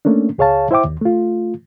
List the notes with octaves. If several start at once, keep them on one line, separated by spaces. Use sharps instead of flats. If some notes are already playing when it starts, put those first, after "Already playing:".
A3 A#3 C#4 D4
C#2 G#4 C#5 F5 A5
E4 C5 E5 G5 D6
D#2
A3 F4